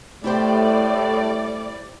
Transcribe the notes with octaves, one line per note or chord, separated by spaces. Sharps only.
A2 G3 A3 E4 G4 C5 D5